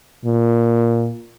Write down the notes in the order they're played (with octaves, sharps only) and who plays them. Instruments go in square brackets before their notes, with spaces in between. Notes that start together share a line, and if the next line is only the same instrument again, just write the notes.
[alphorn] A#2